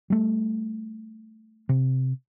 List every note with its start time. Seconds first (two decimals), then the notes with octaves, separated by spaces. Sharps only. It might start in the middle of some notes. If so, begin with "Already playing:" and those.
0.10 G3 A3
1.69 C3